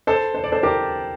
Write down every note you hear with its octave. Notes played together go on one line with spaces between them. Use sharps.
A4 C5
C5
D5
A4 C5
G4 A#4